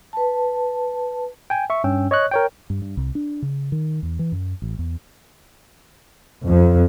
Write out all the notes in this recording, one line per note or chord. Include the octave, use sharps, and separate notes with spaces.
B4 A5
G5 G#5
E5 C#6
G2 C#4 G5 E6
C#5 D#5 C#6 F#6
A#4 C#5 G5
G2
G2
C2
D4
C#3
D#3
E2
E3
F#2
A1
E2
F2